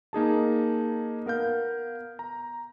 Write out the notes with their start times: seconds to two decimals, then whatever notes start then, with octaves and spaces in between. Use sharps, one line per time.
0.13 A#3 D#4 G#4 A5
1.26 B3 A#4 F5 G6
2.19 A#5